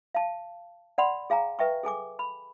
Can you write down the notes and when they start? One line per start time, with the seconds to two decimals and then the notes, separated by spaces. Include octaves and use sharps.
0.15 F5 A5
0.98 D5 F#5 B5 C6
1.30 G#4 F5 G#5 A#5
1.59 B4 E5 G5 C#6
1.83 G#4 A4 G#5 D6
2.19 B5